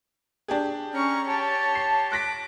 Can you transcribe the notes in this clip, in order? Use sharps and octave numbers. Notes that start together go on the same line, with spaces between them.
D4 G4 G#4
C#4 A#5 C#6
G4 C#5 A5
C7
D6 F#6 A#6 B6